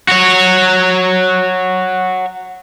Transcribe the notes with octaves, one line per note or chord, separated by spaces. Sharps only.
F#4 C#5